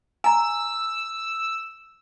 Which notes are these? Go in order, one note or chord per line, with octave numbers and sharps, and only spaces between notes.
G#5 A#5 E6